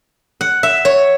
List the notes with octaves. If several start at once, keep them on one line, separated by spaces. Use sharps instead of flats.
F#5
E5
C#5